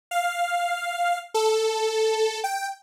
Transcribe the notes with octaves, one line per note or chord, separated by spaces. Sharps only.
F5
A4
G5